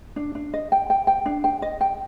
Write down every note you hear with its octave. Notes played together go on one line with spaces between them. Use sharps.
D4
D4
D#5
G5
G5
G5
D4
G5
D#5
G5